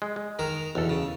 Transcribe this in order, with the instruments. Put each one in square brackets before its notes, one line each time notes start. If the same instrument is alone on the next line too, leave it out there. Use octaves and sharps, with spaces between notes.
[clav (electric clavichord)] G#3
G#3
[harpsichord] D#3 A#4 D#6
[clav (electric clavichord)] B1 A4 [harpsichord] E2
[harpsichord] C#3